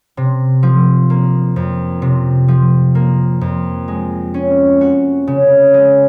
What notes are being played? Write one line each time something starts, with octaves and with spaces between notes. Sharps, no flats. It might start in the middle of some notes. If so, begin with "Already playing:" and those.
C3
F3
A#3
F2
C3
F3
A#3
F2
G#3
C#4
F#4
C#3
G#3